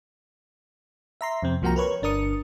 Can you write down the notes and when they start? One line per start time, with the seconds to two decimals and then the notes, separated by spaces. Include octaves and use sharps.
1.21 E5 A#5 C6
1.43 F2 C3 C4
1.62 C2 F3 A#3 F#4 G5 A#5
1.76 A#4 B4 C#5 C#6
2.02 G1 D4 A#4 D#6 C#7